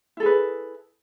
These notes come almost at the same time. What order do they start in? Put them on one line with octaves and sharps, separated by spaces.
E4 A4 G#4 B4